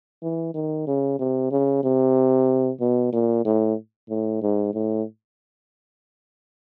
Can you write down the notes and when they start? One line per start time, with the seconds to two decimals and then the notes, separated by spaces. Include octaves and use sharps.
0.22 E3
0.54 D#3
0.87 C#3
1.19 C3
1.51 C#3
1.84 C3
2.81 B2
3.12 A#2
3.45 A2
4.09 A2
4.42 G#2
4.74 A2